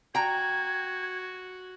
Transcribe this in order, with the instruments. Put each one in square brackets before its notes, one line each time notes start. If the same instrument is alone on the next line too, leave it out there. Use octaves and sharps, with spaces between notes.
[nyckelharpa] F#4 [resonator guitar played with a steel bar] G5 A#5 [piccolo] G#6